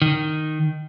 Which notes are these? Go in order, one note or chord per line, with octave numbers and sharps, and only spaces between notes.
D#3